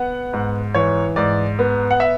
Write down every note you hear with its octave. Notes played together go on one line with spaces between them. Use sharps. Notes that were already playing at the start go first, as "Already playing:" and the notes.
Already playing: B3 F#5
G#2
E3 C#5
G#2 D5
B3
F#5
E5